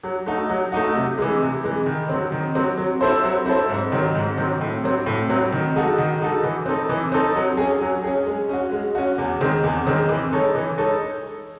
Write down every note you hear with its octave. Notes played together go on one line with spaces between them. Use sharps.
F#3
A3 D#4 F#4
F#3
A3 D#4 F#4
C3
E3 G#3
C3
E3 G#3
D#3
F#3 C4
D#3
F#3 C4
F#3
C4 E4 A4 C5
F#3
C4 E4 A4 C5
G#2
D#3 F#3 C4
G#2
D#3 F#3 C4
A2
F#3 C4
A2
F#3 C4
D#3
G#3 D#4 F#4 A4
D#3
G#3 D#4 F#4 A4
E3
C4 D#4 A4
E3
C4 D#4 A4
F#3
C#4 G#4
F#3
C#4 G#4
G#3
C#4 F#4
G#3
C#4 F#4
E2
D#3 G#3 C4
E2
D#3 G#3 C4
E3
G#3 D#4 A4 C#5
E3
G#3 D#4 A4 C#5